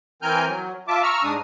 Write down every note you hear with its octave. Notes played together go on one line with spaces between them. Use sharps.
E3 C4 A#4 G#5 F6 G6
F#3
F4 E5 A5 D6
A#5 C#6 E6 F6
G#2 G#3 D4 D#6